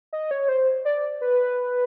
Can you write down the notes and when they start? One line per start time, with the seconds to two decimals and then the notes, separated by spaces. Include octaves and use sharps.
0.13 D#5
0.31 C#5
0.49 C5
0.85 D5
1.21 B4